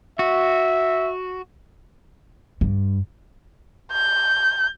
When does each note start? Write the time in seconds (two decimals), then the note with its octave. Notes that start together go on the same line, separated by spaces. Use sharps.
0.19 F#4 E5
2.61 G2
3.92 G6